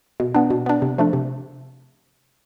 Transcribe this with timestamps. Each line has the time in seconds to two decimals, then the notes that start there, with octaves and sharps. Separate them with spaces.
0.20 B2
0.34 B3 D4
0.50 B2
0.66 B3 D4
0.82 C3
0.98 F3 A3 D4
1.13 C3